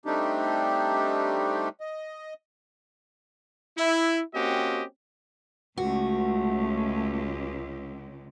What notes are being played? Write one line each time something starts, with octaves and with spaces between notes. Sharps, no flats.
G3 A3 C4 D4 D#4 G4
D#5
E4
A#3 C4 C#4 F#4 G4 D#5
C#2 A3 F#4